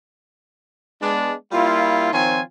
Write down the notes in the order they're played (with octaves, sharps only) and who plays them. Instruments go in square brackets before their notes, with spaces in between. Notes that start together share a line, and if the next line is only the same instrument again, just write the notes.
[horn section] G#3 B3 D4
G3 A#3 E4 F4
D#3 F3 C4 F4 C#5 G#5